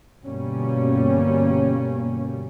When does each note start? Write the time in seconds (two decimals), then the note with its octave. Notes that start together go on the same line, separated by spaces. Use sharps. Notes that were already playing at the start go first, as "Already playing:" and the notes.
0.24 G1 B2 G3 A#3 C#4